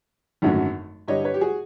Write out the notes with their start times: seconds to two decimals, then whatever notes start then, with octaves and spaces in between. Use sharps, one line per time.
0.42 G#1 F#2 D3 F#3 A3
1.08 G2 D3 G3 C#5 D#5
1.25 B4 C#5
1.34 G4
1.41 F#4 G#4